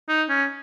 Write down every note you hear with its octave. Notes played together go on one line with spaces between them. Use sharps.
D#4
C#4